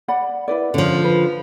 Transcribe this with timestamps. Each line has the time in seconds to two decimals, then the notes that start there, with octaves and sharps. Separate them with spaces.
0.08 D5 F#5 B5
0.48 E4 B4 D5
0.74 D3 F3 C#4
1.04 B4